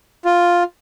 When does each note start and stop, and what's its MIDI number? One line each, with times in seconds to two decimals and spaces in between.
0.25 0.63 65